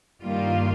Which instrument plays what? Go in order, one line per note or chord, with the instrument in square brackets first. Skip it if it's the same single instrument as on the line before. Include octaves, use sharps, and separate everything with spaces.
[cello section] G2 D#3 G3 A#3 F4